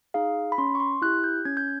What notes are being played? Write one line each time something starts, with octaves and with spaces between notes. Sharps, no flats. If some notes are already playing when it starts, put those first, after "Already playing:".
D#4 G#4 F5
B5
C#4 C6
C#6
C6
E4 G4 F#6
G6
C#4 G#6
G6